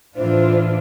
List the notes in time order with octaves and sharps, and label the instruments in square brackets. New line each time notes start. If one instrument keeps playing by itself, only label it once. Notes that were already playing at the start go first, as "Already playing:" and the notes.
[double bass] A2 E3 [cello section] D4 F4 [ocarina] C5